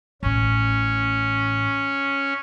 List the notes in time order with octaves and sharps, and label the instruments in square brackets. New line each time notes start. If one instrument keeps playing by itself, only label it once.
[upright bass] A1 A2 [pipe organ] C#4